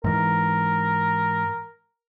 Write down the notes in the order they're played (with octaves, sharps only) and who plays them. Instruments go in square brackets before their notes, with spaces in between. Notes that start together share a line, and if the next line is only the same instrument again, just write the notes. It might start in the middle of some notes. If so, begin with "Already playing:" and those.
[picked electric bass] G#2 E3 [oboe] A#4